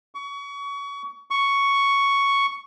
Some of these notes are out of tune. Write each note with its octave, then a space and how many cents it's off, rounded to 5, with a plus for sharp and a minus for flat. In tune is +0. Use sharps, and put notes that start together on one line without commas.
C#6 +30
C#6 +5